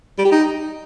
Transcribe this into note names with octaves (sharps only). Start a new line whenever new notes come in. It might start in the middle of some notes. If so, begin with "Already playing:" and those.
G3
G4
D#4